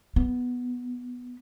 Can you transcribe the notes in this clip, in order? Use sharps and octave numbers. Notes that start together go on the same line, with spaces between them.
B3